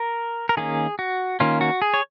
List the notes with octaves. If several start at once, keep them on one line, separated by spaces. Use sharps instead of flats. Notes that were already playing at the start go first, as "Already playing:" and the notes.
Already playing: A#4
A#4
D#3 A#3 C#4 G#4
F#4
D#3 A#3 C#4 F4
F#4
G#4
C#5